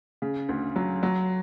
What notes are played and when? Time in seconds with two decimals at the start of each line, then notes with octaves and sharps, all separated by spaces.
0.22 C#3
0.49 D2
0.76 F#3
1.03 F#3